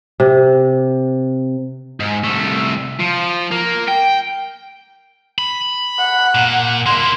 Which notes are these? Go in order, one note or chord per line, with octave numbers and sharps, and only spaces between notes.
C3
G#2
C2 A3
F3
A#3
G5
B5
F#5
A#2
A#3 E4 C6